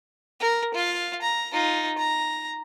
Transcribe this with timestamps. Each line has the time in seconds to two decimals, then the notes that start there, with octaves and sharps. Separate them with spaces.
0.40 A#4
0.74 F4 F5
1.22 A#5
1.53 D#4 F4
1.98 A#5